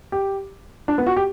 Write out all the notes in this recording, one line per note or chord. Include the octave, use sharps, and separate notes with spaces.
G4
D4
B3
F#4
G4